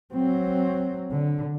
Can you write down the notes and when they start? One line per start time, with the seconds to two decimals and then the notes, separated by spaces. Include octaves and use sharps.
0.14 F#3 C4
1.11 D3